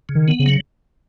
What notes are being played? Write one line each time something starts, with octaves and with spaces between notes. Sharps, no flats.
C#3
D#3
B3
C#3
F#3